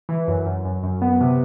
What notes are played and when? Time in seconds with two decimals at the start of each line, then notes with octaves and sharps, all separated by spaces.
0.09 E3
0.28 F#2
0.46 F#2
0.65 F#2
0.83 F#2
1.02 B3
1.21 C3